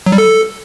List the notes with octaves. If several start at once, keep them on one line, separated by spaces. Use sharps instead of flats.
F#3
G3
A4